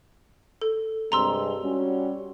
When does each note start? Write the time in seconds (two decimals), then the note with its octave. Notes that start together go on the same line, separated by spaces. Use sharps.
0.62 A4
1.12 G2 C3 G#3 A#5 C6 E6
1.62 G3 C#4 F#4